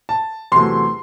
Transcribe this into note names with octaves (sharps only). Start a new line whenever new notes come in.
A5
E2 C3 F#3 A3 C6